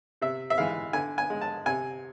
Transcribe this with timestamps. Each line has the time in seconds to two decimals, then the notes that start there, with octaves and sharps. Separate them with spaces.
0.21 C3 E5
0.50 E5
0.58 E3 G#3 F5
0.93 D3 G#5
1.18 G#5
1.30 G#3
1.41 A5
1.66 C3 G#5